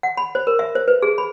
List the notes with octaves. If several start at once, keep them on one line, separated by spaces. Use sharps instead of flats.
F#5
B5
C5
A#4
E5
C5
B4
G#4
B5